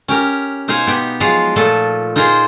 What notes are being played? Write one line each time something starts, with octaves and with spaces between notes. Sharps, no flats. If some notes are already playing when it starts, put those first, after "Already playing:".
C#4 G4 A#4
B2 D#4 C5 F5 G#5
B3 G4
F3 F#3 G#3 F4 F5
A#2 F3 A3 A5
D#4 F4 G#4 A#4 C5